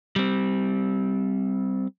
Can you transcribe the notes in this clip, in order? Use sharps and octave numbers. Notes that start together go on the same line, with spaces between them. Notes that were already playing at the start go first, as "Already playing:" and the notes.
G3 C4